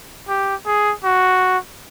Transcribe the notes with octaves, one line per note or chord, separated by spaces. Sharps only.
G4
G#4
F#4